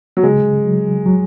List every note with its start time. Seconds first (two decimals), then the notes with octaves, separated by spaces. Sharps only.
0.17 F#3
0.23 C#3 G#3
0.65 F#3
1.06 F#3